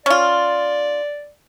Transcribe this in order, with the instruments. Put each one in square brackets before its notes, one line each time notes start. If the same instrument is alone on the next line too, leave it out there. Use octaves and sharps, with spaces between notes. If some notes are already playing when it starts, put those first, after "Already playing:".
[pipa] C#4 F4 [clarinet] D5